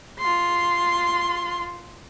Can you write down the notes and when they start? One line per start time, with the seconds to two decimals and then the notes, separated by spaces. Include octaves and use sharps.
0.19 F4 C6